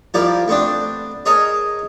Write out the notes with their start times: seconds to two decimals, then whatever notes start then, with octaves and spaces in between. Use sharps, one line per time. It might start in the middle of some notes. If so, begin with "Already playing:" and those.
0.14 F3 G3 E4 A#4 D5
0.48 A3 B3 C4 D4
1.26 G#4 A#4 C#5 D#5 A5